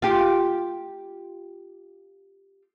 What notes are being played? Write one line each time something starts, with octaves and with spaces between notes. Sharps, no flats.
F4 G4